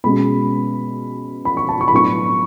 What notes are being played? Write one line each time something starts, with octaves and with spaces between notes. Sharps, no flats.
B2 G#3 C#4 B5
B5
C#6
A5
C#6
B5
A2 F#3 B3 D4 C#6